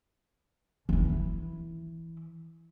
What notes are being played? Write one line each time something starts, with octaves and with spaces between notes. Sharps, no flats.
E3 E4